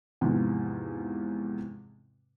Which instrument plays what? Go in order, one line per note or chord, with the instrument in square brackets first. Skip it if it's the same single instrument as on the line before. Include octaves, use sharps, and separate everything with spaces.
[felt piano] E2 G#2 C3 F3